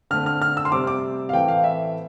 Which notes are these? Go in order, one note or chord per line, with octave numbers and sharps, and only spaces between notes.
D3 A3 C4 F6
F6
F6
E6
C6
C3 G3 C4 D6
D6
F5
A2 E3 A3 C4 G5
F5
E5